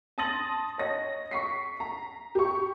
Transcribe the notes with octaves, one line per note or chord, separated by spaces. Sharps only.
A5 C6 D#6 A6 A#6 F#7
C#5 D#5 A#6
C#6 B6 C7
A#5
G4 C#6